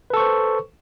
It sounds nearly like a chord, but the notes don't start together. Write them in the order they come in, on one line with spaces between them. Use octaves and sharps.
B4 A4 C#6 C5